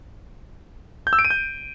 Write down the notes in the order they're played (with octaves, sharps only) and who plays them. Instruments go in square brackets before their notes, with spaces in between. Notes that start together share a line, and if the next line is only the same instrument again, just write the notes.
[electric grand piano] G6
E6
D7
D#7
G6